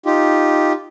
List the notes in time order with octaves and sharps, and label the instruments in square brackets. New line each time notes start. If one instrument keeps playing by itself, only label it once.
[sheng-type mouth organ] D#4 F4 G4